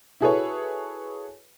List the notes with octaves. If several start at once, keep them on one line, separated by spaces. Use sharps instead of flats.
E4 F#4 G#4 A4 B4 C#5